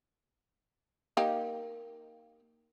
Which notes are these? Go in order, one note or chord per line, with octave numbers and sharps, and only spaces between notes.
A#3 D#4 G4